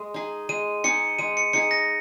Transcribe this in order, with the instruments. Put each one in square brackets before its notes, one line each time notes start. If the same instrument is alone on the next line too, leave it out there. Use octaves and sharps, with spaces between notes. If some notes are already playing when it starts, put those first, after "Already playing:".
Already playing: [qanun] G#3
D#4 G#4
[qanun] G#3 [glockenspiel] D#7
[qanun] D#4 G#4 [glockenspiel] C#7
[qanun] G#3 [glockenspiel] D#7
[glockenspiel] C#7
[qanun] D#4 G#4 [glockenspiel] C#7
[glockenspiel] A#6